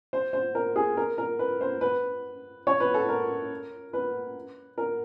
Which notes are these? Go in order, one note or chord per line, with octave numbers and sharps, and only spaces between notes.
C5
C5
A#4
G#4
A#4
A#4
B4
C5
B4
C#5
B4
A4
A#4
B4
A#4